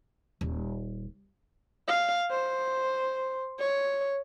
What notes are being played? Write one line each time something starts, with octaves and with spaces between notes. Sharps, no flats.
D#1
F5
C5
C#5